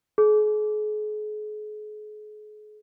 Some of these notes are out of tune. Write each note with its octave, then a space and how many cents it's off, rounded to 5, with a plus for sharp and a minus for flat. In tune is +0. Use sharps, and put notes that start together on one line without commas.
G#4 +40